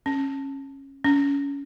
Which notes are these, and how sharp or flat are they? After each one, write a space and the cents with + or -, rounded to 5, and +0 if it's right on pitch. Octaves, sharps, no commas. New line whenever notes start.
C#4 -20
C#4 +25